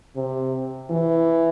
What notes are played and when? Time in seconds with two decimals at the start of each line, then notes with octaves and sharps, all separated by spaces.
0.16 C3
0.90 E3